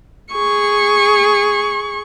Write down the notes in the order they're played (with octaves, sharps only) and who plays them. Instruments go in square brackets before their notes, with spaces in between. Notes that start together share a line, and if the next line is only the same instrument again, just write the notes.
[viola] G#4 C#6